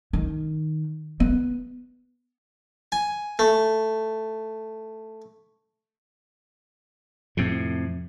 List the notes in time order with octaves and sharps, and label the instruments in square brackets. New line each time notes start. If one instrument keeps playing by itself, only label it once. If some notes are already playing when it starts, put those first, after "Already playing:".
[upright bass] D#3
B3
[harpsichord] G#5
A3
[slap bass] F2 A2 C3